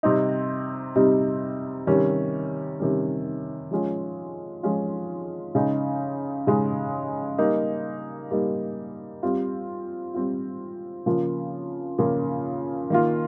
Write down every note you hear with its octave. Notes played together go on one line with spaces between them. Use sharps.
C3 G3 C4 D#4
C3 G3 C4 D#4
C3 D#3 G3 C#4
C3 D#3 G3 C#4
F3 G#3 C#4 F4
F3 G#3 C#4 F4
C#3 G#3 D#4
C#3 G#3 D#4
G3 A#3 D#4
G3 A#3 D#4
G3 C4 F4
G3 C4 F4
C#3 F3 A#3 F4
C#3 F3 A#3 F4
D#3 A#3 F4